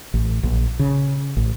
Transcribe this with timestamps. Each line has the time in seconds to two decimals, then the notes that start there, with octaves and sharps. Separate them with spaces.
0.14 A1
0.43 A#1
0.79 C#3
1.37 A1